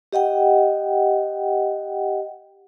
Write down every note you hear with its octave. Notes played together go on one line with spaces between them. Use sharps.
G4 D#5 F#5 G5